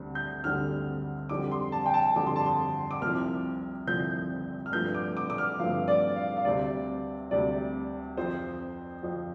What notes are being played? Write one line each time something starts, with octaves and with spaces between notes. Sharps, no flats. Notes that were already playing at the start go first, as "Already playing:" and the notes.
Already playing: D2 D3 G3 C4
G6
D2 D3 G3 C4 F6
F2 D3 G3 C4 D6
C6
A5
G5
A5
F2 D3 G3 C4 D6
C6
A5
C6
D6
C2 C3 F3 C4 F6
C2 C3 F3 C4 G6
F6
G2 F3 A3 C4 G6
D6
D6
D6
F6
G2 F3 A3 C4 F5
D5
F5
F5
D2 C3 G3 C4 D5
D2 C3 G3 C4 D5
F2 F3 C4 C5
F2 F3 C4